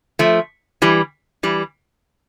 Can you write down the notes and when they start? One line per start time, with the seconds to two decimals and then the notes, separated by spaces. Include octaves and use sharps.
0.19 F3 A3
0.82 E3 G3
1.43 E3 G3